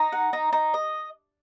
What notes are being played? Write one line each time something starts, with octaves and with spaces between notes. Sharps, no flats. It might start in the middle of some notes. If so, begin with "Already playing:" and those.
Already playing: D#4
F#5
D#4
D#4
D#5